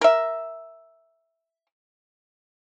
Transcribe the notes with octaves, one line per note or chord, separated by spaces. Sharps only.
A#4 E5